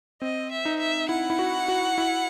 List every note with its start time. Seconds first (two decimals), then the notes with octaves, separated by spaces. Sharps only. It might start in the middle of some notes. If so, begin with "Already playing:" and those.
0.22 C4 D#5
0.51 E5
0.65 D#4
0.80 E5
1.09 E4 F#5
1.30 E4
1.39 F#4
1.68 F#4
1.98 E4